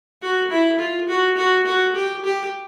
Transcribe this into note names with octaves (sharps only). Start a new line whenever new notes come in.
F#4
E4
F4
F#4
F#4
F#4
G4
G4